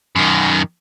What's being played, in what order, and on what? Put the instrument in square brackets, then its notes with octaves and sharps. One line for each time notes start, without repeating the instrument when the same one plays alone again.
[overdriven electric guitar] F#2 D#3